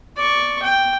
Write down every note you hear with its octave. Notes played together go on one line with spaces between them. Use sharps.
D5 C#6
G5